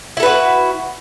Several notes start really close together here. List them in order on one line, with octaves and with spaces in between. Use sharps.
E4 A4 B4 F#4